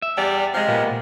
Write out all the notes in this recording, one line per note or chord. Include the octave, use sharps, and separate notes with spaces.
E5
E2 G3 D5
C3 F3 G#3
A#2 A#3 B3